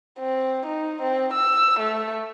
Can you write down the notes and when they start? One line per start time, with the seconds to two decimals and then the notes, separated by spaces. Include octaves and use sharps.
0.19 C4
0.66 D#4
1.02 C4
1.33 E6
1.80 A3